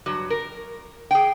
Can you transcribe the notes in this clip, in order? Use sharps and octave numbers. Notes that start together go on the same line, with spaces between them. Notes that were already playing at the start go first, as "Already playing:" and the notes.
G2 F#3
A#4
G#4 G5